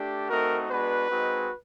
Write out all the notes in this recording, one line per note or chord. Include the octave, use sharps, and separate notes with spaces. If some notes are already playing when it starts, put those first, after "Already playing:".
Already playing: A3 D4 G4
A3 C4 D#4 F#4 A#4
G#3 B3 D4 F#4 B4
G#3 C4 D#4 F#4